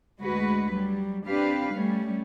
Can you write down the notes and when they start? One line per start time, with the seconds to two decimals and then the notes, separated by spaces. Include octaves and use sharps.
0.21 D2 G#3 F#4 B4
0.73 F#3 G3
1.28 C4 D4 G4 B4 F5
1.73 G3 A3 C#4